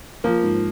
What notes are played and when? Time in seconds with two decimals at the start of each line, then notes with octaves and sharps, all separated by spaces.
0.24 F3 A#3 F4
0.43 G#2